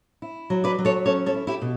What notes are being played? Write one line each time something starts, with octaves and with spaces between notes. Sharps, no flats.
E4
F#3
B4 D5
F#3
A4 C#5
C#4 A4 C#5
A4 C#5
E4
E4 G4
B2